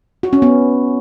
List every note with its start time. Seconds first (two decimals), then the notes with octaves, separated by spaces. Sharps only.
0.23 F#4
0.33 C#4
0.42 B3